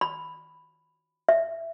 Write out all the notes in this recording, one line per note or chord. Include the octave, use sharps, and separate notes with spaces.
B5
E5